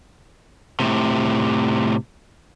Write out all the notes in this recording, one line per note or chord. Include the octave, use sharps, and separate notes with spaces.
A2 C3